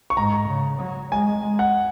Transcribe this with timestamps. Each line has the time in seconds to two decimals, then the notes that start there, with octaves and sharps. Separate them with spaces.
0.10 C#6
0.17 G#2 A#5
0.48 C#3
0.80 F#3
1.12 G#3 G#5
1.42 G#3
1.59 F#5